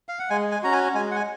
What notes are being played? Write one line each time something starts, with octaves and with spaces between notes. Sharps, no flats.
F5
F#5
G#3 G#5
G#5
C#4 F#4 A#5
G#5
G#3 G#5
F#5
G#5